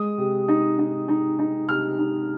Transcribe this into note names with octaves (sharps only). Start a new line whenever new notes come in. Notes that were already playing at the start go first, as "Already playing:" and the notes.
Already playing: G#3 D#6
C3
D#4
D#4
D#4
D#4
C3 F6
D#4